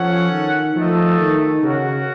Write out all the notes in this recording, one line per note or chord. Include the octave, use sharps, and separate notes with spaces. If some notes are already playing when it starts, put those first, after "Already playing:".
Already playing: F3 C#4 A4 C#5 F#5
D#3
F3 A3 D#4 A4 D#5
D#3
C#3 F#4 A#4 C#5 F#5